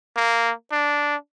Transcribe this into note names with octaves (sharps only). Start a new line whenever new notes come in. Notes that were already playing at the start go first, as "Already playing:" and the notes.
A#3
D4